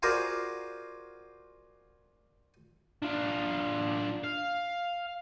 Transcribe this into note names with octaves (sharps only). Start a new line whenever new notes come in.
F4 F#4 G#4 A#4 C5 D5
D4 F4
F5